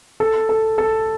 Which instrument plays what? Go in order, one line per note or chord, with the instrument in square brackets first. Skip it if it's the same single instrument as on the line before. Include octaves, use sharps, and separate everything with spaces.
[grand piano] A4
A4
A4